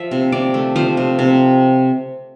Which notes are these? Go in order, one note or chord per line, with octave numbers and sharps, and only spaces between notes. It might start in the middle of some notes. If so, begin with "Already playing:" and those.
Already playing: F3 E5
C3
C3 D5
A3
F3 C5
C3
C3